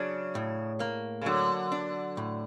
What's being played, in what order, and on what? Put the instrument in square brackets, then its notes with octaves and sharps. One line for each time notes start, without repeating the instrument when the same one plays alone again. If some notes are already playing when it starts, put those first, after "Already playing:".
Already playing: [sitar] C#3 [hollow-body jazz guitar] F#3 D4
[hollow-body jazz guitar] A2
A#3
[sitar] C#3
[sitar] D3 [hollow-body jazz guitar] F#3
[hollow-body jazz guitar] D4
A2